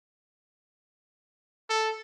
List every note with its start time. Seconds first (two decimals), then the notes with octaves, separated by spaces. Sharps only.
1.69 A4